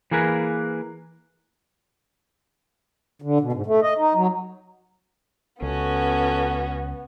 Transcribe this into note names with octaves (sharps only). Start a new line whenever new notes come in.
E3 A#3 G#4 A#4 B4
D3
B2
G#2
A3
D#5
D#4
F#3
C#2 B3 C#4 F#4 A4